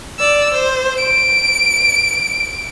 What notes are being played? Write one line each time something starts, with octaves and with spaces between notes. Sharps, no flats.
D5 E6
C5
D7